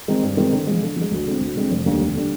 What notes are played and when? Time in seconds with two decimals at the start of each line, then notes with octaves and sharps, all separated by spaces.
0.08 D#3 G#3 C4 D#4
0.23 G2
0.37 D#3 G#3 C4 D#4
0.52 D3
0.67 F3 G#3
0.82 D3
0.96 F3
1.01 G#3
1.11 D2
1.27 D3 G#3 C4
1.41 D2
1.56 D3 G#3 C4
1.70 F1
1.86 D#2 D3 G3 D4
2.00 F1
2.15 D3 G3 D4